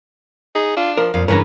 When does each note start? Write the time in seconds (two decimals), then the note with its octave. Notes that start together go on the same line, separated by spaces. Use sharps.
0.55 D#4 G#4
0.77 D4 F4
0.97 F3 A#4
1.14 F2 A#2 F5
1.28 G2 C#3 E3 C#4 A#4 B4 A#5